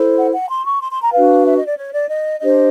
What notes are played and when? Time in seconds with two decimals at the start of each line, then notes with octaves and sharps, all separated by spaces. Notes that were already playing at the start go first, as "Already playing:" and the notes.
Already playing: E4 A4 C5
0.18 F#5
0.33 F#5
0.50 C6
0.66 C#6
0.81 C6
0.91 C6
1.03 A#5
1.13 D4 F#4 B4 F5
1.45 E5
1.56 D#5
1.67 D5
1.78 C#5
1.94 D5
2.09 D#5
2.41 D4 G4 C5 D#5